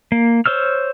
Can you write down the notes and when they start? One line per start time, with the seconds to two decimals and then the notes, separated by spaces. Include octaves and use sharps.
0.12 A#3
0.46 C5 C#5 E6 F6